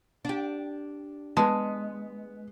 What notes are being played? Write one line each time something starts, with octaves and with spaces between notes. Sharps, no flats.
D4 G4
G#3 B3 A5